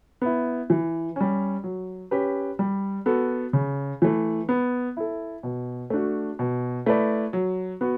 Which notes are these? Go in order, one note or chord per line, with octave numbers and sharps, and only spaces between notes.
B3 E4
E3
G3 C#4
F#3
C#4 G4 B4
G3
B3 F#4 A4
C#3
E3 A3
B3
E4 A4
B2
A3 D4 F#4
B2
A3 E4 B4 D5
F#3
B3 F#4